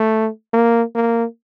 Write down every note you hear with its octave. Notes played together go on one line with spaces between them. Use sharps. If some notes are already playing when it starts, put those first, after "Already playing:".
Already playing: A3
A#3
A#3